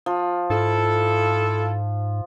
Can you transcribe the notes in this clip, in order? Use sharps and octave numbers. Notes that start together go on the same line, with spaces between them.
F3
G#2 E4 F4 A4